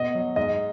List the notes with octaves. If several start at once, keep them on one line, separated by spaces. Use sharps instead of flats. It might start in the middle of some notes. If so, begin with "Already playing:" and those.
Already playing: B2 D#5
F#3
G#2 D#5